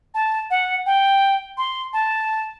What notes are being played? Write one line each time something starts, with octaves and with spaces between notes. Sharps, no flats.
A5
F#5
G5
C6
A5